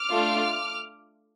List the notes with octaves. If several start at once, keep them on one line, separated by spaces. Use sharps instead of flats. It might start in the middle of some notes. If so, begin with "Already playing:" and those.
Already playing: D6 F6
A3 D4 F4